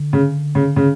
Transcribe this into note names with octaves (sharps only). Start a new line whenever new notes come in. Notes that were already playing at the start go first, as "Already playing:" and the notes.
Already playing: D3
C#3
C#3
C#3